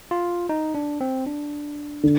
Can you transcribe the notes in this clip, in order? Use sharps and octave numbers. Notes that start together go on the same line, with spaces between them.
F4
D#4
D4
C4
D4
D3